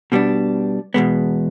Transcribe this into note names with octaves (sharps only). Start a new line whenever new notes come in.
B2 G3 B3 D4
E2 B2 G#3 B3